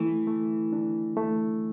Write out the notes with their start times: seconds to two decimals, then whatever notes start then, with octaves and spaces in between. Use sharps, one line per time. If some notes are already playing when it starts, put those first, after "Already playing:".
Already playing: E3 A3
0.27 A3
0.73 D4
1.17 A3